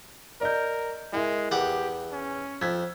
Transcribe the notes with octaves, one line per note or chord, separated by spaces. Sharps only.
A#4 D5 D#5 G6
G#3 E4 A#4 E5
E2 G4 F#5 D6
C#4
F2 E6 G#6 B6